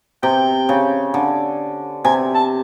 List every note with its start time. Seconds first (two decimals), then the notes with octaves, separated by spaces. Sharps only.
0.23 C3 G5
0.69 C#3
1.14 D3
2.05 C3 G#5
2.35 A5